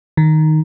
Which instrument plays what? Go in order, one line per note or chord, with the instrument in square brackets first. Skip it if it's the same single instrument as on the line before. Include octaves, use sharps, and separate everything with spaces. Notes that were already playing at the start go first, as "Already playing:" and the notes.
[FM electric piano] D#3